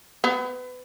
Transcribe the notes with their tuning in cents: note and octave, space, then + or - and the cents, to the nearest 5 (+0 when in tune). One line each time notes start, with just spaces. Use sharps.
B3 +30